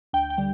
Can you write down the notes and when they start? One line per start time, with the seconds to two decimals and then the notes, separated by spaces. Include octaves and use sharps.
0.13 D2 G5
0.30 G5
0.38 D3 G3